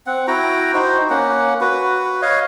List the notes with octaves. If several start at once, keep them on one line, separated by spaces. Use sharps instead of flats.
C4 F#5
E4 F#4 G5 A#5
D#4 F#4 C5
A#3 C#4 F#5
F#4 B4
C#5 D#5 F5